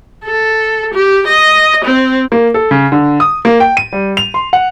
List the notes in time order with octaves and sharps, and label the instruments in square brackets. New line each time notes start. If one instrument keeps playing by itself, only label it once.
[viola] A4
G4
D#5
C4
[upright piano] A#3
A4
C#3
D3
D#6
A#3
G5
D#7
G3
F7
C6
F#5